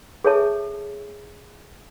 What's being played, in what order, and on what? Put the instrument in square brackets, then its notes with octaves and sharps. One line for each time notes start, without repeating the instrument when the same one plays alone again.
[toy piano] G#4 A4 C#5 E5 A5